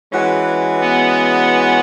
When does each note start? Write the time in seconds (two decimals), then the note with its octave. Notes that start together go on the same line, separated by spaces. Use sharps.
0.13 E3 G#3 C#4 F#4 B4
0.81 B3